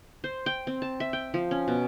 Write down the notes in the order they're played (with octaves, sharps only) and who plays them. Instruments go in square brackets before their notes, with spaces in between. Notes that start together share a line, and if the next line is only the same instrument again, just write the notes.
[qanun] C5
G5
C4
A5
E5
G5
F3
C#4
B2